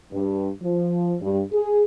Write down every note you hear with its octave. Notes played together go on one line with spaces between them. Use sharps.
G2
F3
G2
G#4